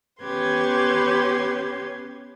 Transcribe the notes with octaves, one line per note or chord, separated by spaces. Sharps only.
B3 C#4 G4 B4 C6 G#6